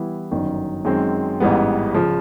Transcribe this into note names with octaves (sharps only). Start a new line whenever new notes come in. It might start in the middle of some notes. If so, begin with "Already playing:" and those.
Already playing: E3 G3 B3 E4
G1 F#2 D#3
F#2 D#3 G#3 C4
A1 G#2 E3 G3 B3
C#3 F3